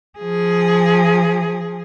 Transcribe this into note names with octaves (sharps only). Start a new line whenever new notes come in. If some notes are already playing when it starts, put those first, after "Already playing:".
F3 G#4